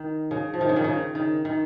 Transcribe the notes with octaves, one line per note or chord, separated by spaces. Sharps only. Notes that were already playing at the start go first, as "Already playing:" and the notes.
Already playing: D#3
C#3
F3
D#3
C#3
D#3
C#3
D#3
D#3